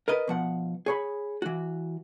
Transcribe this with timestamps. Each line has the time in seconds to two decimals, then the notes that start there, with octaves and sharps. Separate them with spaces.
0.08 A#4 B4 D#5
0.27 B2 F3 F#5
0.86 G#4 C#5 B5
1.42 E3 F#4